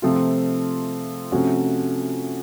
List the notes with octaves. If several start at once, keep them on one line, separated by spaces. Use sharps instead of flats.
C3 F3 A3 C4 F4
C3 F3 A3 C#4 F#4